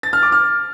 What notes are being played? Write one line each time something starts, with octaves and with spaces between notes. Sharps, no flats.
A6
F6
D6
F6